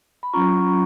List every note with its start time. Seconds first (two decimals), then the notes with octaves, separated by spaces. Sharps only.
0.23 B5
0.33 F#3 C#4 F4 A#5 C#6